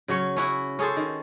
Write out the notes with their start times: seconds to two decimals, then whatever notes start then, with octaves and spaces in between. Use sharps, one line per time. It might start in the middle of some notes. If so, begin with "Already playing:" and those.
0.08 C#3 F#3 C#4 C#5
0.37 C#4 E4 F#4
0.79 C#4 G#4 A4 C5
0.97 D#3